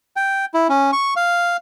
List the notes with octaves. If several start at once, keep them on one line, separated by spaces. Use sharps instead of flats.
G5
E4
C#4
C#6
F5